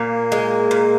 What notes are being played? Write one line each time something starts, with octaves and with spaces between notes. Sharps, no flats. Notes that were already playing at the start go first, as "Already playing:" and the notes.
Already playing: A#2 A#3
G#3
A#2